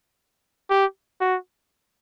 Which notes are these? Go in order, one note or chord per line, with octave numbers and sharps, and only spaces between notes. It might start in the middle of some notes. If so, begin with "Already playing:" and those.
G4
F#4